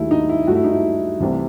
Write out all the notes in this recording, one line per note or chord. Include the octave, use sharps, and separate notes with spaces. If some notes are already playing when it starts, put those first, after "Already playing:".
Already playing: D#2 D#3 F#3 A3 E4
D#4
E4
G2 F#3 A3 F#4
E4
D#4
E4
C2 C3 E3 A3